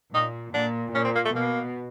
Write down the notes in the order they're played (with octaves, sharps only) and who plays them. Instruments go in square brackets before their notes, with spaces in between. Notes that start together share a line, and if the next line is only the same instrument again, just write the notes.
[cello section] A#2 [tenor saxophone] D#4
[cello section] A#2 [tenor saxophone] D4
[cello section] A#2 [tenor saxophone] C#4
[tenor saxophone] C4
A#3
A3
[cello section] B2 [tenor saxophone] A#3